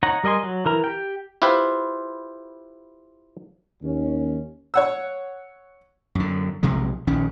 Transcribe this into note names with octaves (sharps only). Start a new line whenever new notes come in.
D#4 C#5 F#5 A#5
G3 A#4 D#5 G#5 C6
F#3
E3 A#4 A#5
G4 G5
E4 F4 G4 B4 C5
D#2 C#4
C#5 F#5 E6
F#2 D3
B1 C3 F3 G#3
A#1 D#3 C#4